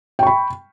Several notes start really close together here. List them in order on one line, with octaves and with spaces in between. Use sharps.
G5 C#6 B5